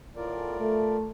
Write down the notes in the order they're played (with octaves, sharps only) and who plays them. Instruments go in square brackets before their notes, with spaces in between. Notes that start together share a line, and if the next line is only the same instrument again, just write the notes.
[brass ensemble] E2 A2 [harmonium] F4 A#4 D5
[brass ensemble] A3